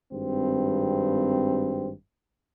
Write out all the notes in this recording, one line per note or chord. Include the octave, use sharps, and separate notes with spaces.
G#1 G2 C4